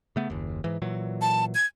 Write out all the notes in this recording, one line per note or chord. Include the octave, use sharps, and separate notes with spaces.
C#3 A3 B3
F#1 D#2
G#2 E3
A#2 E3 F#3
A5
G#6